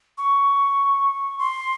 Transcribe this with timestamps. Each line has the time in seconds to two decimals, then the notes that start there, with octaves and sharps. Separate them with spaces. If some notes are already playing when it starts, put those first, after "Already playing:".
0.18 C#6
1.39 C6